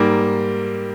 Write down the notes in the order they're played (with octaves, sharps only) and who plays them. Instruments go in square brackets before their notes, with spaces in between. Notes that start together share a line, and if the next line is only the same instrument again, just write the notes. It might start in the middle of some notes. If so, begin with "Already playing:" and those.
Already playing: [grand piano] G#2 G3 A#3